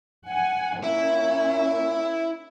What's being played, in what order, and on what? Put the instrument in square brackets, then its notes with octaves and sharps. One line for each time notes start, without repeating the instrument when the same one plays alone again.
[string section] F#5 G#5
[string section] A#2 C#4 [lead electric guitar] E4